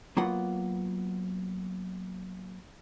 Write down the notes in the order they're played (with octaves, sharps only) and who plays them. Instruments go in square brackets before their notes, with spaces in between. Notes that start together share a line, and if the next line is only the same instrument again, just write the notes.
[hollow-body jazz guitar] F#3 A#3 B3 F4 F#5